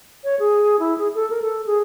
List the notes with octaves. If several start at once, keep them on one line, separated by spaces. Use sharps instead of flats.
C#5
G#4
E4
G#4
A4
A#4
A4
G#4